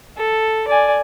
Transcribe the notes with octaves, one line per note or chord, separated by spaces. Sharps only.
A4
D5 G#5